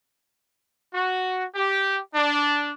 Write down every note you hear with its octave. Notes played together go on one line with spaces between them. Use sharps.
F#4
G4
D4